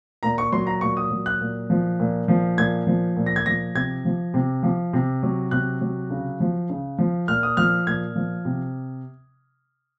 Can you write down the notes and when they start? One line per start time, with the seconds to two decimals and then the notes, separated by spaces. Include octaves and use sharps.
0.23 A#2 A#5
0.38 C#6
0.52 F#3 C6
0.67 A#5
0.81 A#2 C#6
0.97 D#6
1.11 F#3
1.26 F#6
1.41 A#2
1.70 F3
2.00 A#2
2.28 F3
2.58 A#2 G#6
2.87 F3
3.17 A#2
3.26 A#6
3.36 G#6
3.46 F3 A#6
3.75 C3 G#6
4.05 F3
4.34 C3
4.63 F3
4.93 C3
5.23 F#3
5.51 C3 F#6
5.81 F#3
6.10 C#3
6.40 F3
6.70 C#3
6.98 F3
7.28 A#2 F6
7.43 D#6
7.57 F3 F6
7.87 A#2 G#6
8.16 F3
8.45 C3